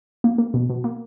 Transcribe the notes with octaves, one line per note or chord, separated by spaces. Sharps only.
A#3
A#3
B2
B2
A#3